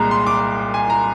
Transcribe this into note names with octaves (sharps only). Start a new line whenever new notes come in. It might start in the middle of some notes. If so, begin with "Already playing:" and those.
Already playing: C2 A#2 G#3 A#5
C6
D6
G#5
A#5